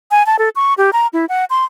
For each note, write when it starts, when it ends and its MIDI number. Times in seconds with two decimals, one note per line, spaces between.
0.11 0.25 80
0.26 0.37 81
0.39 0.49 69
0.56 0.74 85
0.78 0.90 67
0.93 1.07 82
1.13 1.25 64
1.29 1.45 78
1.50 1.64 84